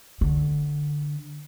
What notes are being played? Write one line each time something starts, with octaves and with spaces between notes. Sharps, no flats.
D3